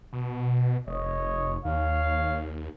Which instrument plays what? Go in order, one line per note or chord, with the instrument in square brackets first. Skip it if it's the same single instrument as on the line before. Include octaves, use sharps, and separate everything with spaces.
[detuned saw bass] B2
[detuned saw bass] F1 [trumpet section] C#5 D#5
[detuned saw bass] D#2 [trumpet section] C#5 F5